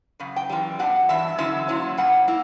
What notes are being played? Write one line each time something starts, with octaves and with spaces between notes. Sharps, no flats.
F#2 C#3
G5
F#2 E3 G3
B2 G3 D4 F#5
G2 E3 E5
D3 F#3 C#4 E4 E5
A#2 F#3 C#4 E4
C#3 G3 C#4 F#5
A#3 E4